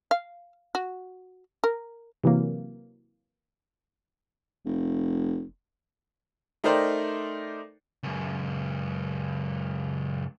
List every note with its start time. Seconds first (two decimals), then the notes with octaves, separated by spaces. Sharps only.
0.11 F5
0.75 F#4
1.64 A#4
2.24 C3 E3 F#3 A#3
4.65 F1
6.64 A3 D#4 A#4 C5 D5 G5
8.03 C#2 F#2